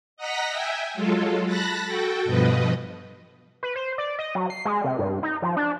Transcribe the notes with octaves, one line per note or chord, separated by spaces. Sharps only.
D#5 F#5 A#5 A#6 B6
E5 G5 G#5
F#3 G#3 F4 A4
A5 B5 F#6 A#6
F#4 A4 G5
G2 B2 F3 B4 D#5
B4
C5
D5
D#5
F#3
C7
G#3
C3
G2
D#4
F3
D4